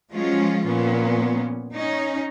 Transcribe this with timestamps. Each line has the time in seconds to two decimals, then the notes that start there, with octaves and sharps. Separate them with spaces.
0.11 F3 F#3 G#3 C#4 F4
0.65 A#2 F3 B3 C#4
1.74 C#4 D#4